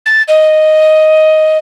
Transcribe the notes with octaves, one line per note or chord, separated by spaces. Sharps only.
A6
D#5